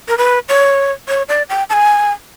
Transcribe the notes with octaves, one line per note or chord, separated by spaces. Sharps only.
A#4
B4
C#5
C#5
D5
G5
A5
G#5